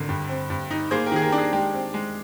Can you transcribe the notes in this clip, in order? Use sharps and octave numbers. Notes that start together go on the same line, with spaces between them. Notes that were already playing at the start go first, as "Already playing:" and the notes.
Already playing: G#1 D3 A#4
G2
C4
G2
D#4
A#3 G#4 C5
G4 A#4
D#3 G#4
G4 A#4
D4
G#4
G#3 G4
C4
G#3